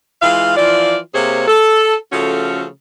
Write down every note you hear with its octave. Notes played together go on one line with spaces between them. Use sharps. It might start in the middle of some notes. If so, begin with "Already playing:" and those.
E3 G#3 F4 F5
E3 F3 F4 D5
C3 A#3 G4 G#4 C5 C#5
A4
C#3 F3 A3 C#4 F#4 A4